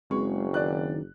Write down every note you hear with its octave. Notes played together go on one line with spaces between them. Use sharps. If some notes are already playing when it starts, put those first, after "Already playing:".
F#1 G#3 C4 F#4 B4 C#6
D#3 D5 F#6